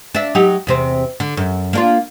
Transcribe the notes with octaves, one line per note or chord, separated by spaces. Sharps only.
D4 E5
F#3 D#4 G4
E2 C3 C4
D3
F#2
A#3 D4 F4